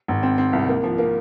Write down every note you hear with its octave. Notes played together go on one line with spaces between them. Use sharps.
G#1
C4
C4
C2
A#3
F3
A#3